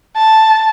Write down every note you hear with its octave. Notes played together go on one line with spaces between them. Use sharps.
A5